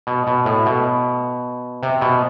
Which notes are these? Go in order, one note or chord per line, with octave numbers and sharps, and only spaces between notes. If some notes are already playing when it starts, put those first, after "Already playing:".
B2
B2
A2
B2
C3
B2